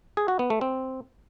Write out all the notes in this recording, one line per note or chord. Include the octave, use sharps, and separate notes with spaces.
G#4
F#4
B3
A3
C4